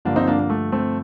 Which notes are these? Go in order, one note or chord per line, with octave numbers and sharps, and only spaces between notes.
G2 D3 F3 A#3 D4
C4 D#4
A#3 D4
A#3
A3
A3 C4